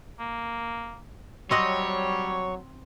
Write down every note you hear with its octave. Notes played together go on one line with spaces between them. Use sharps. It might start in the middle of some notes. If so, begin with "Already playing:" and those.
A#3
F#3 G3 C4 C#5 D#5 F#5